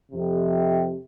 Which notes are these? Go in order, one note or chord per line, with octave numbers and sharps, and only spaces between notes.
F2 C3